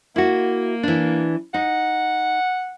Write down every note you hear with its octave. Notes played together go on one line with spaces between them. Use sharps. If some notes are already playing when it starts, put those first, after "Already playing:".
A#3 E4 F#4
E3 D4
D#4 F#5